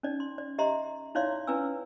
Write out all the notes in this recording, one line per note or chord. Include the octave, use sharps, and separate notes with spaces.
C#4 D#4 D5
C6
D5
G4 D#5 E5 A#5 C6
D#4 E4 C#5 D5 F5 C6
C#4 E4 B4 D5 G#5 E6